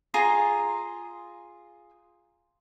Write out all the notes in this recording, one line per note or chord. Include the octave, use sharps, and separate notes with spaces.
F4 G#4 A#5 C6